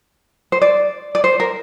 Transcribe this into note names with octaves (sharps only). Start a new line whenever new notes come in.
C5
D5
D5
C5
A#4